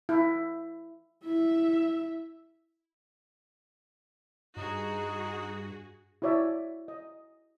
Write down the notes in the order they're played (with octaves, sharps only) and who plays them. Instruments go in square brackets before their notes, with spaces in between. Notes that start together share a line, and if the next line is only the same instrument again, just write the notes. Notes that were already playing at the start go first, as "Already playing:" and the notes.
[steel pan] E4
[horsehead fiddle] E4 E5
[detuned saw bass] G2 [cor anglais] D#4 [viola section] F#4 G#4
[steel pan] E4 F#4 C#5 D5 E5
D#5